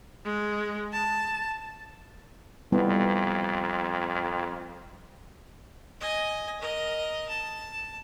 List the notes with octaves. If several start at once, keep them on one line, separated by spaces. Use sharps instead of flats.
G#3
A5
F2 G3 B3 E4
D#5 G#5
A#4 D#5
A5